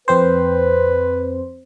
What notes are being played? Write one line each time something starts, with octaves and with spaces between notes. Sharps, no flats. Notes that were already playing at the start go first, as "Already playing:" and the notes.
F2 C4 B4 C5